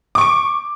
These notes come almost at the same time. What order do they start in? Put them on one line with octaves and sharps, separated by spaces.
D6 C#6 D7